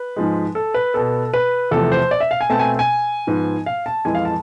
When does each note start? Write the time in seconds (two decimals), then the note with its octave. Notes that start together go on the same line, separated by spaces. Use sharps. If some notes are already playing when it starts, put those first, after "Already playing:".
Already playing: B4
0.16 G#2 F3 G#3
0.55 A4
0.74 B4
0.94 B2 B3 A4
1.34 B4
1.71 E2 C3 F3 A3 A4
1.92 C5
2.11 D5
2.20 E5
2.31 F5
2.41 G#5
2.49 B2 A3 C4 A5
2.59 G#5
2.79 G#5
3.27 G#2 F3 B3
3.66 F5
3.86 A5
4.05 F2 E3 G#3 G#5
4.15 F5
4.25 A5